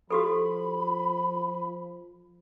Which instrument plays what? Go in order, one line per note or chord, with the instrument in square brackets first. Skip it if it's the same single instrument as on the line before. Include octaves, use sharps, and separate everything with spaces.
[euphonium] F3 [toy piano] F#4 G4 A4 [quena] B5